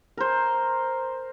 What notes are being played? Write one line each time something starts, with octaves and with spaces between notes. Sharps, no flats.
A#4 C5